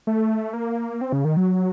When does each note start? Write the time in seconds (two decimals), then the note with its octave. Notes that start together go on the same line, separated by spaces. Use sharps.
0.07 A3
0.53 A#3
1.01 C4
1.12 C#3
1.25 D#3
1.37 F#3